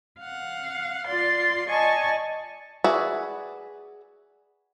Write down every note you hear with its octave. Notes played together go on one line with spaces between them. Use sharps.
F5 F#5
F4 D5 C6
D5 D#5 G#5 A5 C#6
F#4 G#4 B4 D5 E5